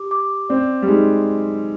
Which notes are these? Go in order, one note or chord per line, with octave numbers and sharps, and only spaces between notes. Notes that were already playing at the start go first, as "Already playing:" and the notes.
Already playing: G4 D6
D6
C4 D5
G3
G#3 D#4